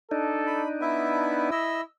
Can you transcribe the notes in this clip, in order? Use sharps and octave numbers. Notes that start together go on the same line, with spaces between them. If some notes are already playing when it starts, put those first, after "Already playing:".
D4 D#4 A4
B5
B3 E4 E5
E4 D#5 E6